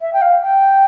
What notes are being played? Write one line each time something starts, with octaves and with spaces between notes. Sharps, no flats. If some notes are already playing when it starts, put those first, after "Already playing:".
E5
G5
F5
G5